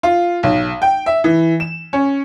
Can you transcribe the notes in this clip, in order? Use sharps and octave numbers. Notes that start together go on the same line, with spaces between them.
F4
B1
G5
E5
E3
E7
C#4